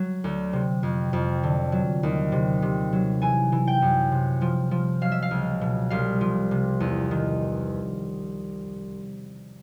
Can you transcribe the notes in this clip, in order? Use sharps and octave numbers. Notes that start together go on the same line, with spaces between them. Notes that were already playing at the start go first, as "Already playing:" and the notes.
Already playing: F#3
D2
C3
F2
F2
D3
F#3
D#2
C3
C3
F#3
E3 G#5
E3
G5
F#2
C3
F3
F3
F#3 F5
E5
F5
C#2
B2
C2 F5
F3
C3
E2
D#3